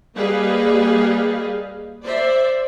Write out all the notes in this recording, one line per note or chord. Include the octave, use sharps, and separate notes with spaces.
G3 A#3 G#4 B4 D#5 F5
C5 D5 E5